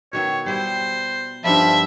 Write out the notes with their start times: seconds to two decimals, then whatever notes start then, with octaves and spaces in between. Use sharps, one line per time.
0.13 B2 D#3 C#5 E5
0.46 G3 E4 C5
1.45 G2 D#3 F3 D5 E5 B5